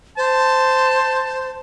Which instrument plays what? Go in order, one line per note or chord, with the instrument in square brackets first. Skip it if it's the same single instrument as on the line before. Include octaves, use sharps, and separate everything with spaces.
[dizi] C5 [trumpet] A5